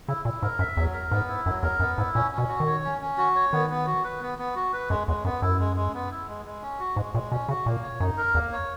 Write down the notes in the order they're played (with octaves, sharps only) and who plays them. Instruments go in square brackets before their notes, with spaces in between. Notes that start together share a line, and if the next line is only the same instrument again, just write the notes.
[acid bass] C#3 [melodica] E4
[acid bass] A#2 [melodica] E4
[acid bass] G#2 [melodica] A#4
[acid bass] F#2 [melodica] E5
[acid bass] E2 [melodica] F#3
[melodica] A#4
[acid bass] G#2 [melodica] B3
[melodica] E4
[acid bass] F#2 [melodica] F#3
[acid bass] E2 [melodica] A#4
[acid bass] F#2 [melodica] B3
[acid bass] G#2 [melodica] E4
[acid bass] A#2 [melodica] C#4
[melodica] C#4
[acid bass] B2
[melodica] F#4
[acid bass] D#3
[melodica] C#5
C#4
C#4
F#4
C#5
[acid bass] D#3 [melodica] B3
[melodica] B3
F#4
B4
B3
B3
F#4
B4
[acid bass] F#2 [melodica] G#3
[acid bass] E2 [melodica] G#3
[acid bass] F#2 [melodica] B3
[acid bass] F#2 [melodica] E4
[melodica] G#3
G#3
B3
E4
G#3
G#3
C#4
F#4
[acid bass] G#2 [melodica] G#3
[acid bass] A#2 [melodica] G#3
[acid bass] B2 [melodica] C#4
[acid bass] C#3 [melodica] F#4
[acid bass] A#2 [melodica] A#3
[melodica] C#5
[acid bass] F#2 [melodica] D#4
[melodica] A#4
[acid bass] E2 [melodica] A#3
[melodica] C#5